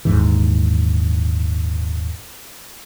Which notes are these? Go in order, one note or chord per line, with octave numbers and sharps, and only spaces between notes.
D#1 D#2 G#2 E3